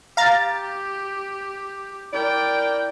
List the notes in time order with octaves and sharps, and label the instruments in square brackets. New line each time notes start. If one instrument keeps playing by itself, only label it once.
[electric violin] G4 [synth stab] F5 A#5 A6
[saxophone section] E4 A#4 D5 [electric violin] G5